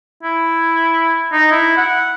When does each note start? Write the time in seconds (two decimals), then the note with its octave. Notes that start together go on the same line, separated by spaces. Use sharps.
0.23 E4
1.32 D#4
1.52 E4
1.77 F#5